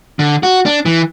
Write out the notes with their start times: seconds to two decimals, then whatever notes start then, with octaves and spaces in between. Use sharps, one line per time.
0.19 D3
0.43 F#4
0.66 D4
0.86 E3